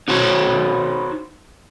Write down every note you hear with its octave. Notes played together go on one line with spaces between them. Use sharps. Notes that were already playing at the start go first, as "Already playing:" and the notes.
D#4 F#4 C5 C#5